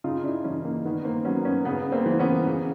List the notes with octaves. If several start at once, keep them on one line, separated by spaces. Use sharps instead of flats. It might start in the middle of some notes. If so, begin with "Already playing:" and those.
C#3 D#4 F4
D4 E4
E3 C#4 D#4
A#3
D#3 B3
A#3 C4
F#3 B3 C#4
B3 C#4
C#3 B3
A#3 C4
E3
B3 C#4
C#3